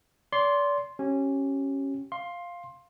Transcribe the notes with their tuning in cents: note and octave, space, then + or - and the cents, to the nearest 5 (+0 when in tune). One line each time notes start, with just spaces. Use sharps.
D5 -35 C6 +0
C#4 -15 G4 -30
F5 +0 C6 +15